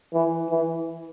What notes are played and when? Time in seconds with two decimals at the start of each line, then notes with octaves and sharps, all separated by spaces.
0.14 E3
0.50 E3